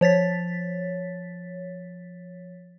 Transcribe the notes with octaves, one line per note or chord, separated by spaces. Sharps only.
F3 C#5 A6 B6